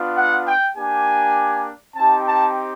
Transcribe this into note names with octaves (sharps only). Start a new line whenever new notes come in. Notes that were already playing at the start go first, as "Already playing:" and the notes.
Already playing: B3 D4 F4
F#5
G5
A#3 D4 G4 G#5
C4 D#4 G4 A5
A5